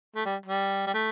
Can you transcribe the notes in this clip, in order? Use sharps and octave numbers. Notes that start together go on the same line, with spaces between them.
A3
G3
G3
G3
A3